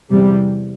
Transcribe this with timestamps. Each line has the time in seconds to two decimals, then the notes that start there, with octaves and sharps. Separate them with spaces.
0.10 E2 C3 G3